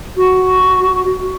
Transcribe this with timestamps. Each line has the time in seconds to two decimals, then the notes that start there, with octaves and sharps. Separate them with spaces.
0.16 F#4